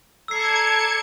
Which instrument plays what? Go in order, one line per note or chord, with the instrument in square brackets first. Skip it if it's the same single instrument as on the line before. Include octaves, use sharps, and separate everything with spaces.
[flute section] A4 D5 A#5 [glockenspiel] E6 C7 [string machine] G#6 C#7